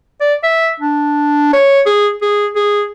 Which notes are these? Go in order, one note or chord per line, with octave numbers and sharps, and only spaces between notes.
D5
E5
D4
C#5
G#4
G#4
G#4